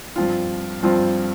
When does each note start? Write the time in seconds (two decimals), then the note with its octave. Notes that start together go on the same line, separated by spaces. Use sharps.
0.16 G2 F3 C4 F4
0.83 G2 F3 C4 F4